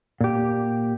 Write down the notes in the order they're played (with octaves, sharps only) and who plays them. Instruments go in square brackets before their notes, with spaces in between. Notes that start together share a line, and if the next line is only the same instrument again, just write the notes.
[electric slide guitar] A#2 G4